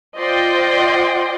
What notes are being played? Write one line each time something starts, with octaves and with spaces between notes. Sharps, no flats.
F4 C5 D5 D#5 G5 C6